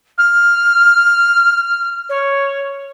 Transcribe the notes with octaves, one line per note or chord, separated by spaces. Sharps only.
F6
C#5